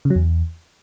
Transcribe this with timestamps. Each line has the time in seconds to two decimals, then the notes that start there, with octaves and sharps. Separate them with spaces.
0.05 C#3
0.10 F#3
0.16 E2